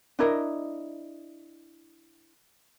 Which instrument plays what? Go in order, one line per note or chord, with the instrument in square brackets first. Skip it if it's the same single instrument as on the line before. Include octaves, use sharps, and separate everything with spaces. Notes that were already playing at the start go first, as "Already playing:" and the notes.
[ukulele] D4 E4 A#4 D#5